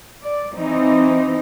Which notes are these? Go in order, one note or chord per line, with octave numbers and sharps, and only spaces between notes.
D5
E3 C4 D#4